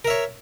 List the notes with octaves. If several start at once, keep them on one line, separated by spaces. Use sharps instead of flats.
A#4 C#5 E5